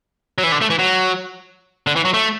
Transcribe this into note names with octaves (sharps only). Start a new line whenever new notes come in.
F#3
E3
D3
A3
E3
F#3
D3
E3
F#3
A3